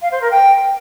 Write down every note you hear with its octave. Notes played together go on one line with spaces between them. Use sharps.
F5
C5
A#4
G5